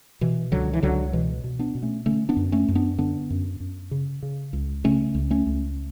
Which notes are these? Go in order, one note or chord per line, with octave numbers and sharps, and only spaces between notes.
B2 E3
C#2 D3 F#3
E3
C#2 D3 F#3
B2 E3 G#3
B2
B3 D4
B2
A3 C#4
D3 A3 C#4
B3 D4
F#2
A3 C#4
F#2
B3 D4
D3 B3 D4
F#2
F#2
C#3
C#3
C#2
C#3 A3 C#4
C#2
A3 C#4
C#2